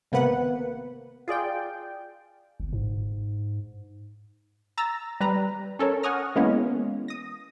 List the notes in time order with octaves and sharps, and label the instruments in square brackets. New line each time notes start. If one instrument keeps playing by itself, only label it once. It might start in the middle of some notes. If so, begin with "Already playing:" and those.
[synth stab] G#1 C3 A#3 B3 B4 F#5
F4 G#4 D5 G5
[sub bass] G1
G#2
[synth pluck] A#5 E6 A6 A#6
G3 B4 A#5
C#4 A4 A#4 C#5
F#5 G#5 C#6 D#6 F6 A#6
E3 G#3 A#3 B3 C#4
D#6 A#6